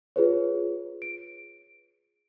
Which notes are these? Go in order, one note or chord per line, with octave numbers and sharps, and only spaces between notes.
F4 G#4 B4 C#5
D7